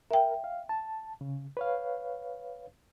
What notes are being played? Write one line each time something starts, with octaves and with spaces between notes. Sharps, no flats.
A#4 E5 G5
F5
A5
C#3
B4 C#5 F5